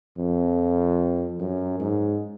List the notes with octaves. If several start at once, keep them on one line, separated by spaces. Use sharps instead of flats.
F2
F#2
G#2